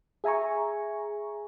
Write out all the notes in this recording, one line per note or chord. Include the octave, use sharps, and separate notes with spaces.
G#4 E5 G#5 A#5 C#6